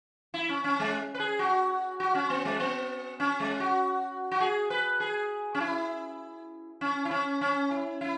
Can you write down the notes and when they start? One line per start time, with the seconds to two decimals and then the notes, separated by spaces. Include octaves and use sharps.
0.34 E4
0.49 C#4
0.64 C#4
0.80 G#3
1.15 B4
1.19 G#4
1.39 F#4
2.00 F#4
2.15 C#4
2.30 B3
2.45 G#3
2.60 B3
3.20 C#4
3.40 G#3
3.60 F#4
4.31 F#4
4.40 G#4
4.70 B4
5.00 G#4
5.55 C#4
5.60 E4
6.81 C#4
7.05 E4
7.11 C#4
7.41 C#4
7.71 E4
8.01 E4